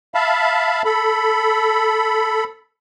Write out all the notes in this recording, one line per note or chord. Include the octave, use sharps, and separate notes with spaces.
E5 F5 A5 B5
A4 B5